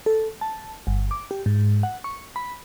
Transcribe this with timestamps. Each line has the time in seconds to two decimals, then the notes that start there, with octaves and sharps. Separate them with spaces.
0.06 A4
0.41 A5
0.87 G1
1.11 D6
1.31 G4
1.46 G#2
1.83 F#5
2.04 C#6
2.36 B5